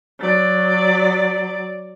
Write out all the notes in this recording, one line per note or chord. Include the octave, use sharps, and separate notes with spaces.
F#3 D5